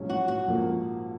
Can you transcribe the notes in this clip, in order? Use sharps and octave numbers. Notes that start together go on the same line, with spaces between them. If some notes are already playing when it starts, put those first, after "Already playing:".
Already playing: A#1 G#2 F#3 C#4
F#4
F#4
A#1 G#2 F3 A#3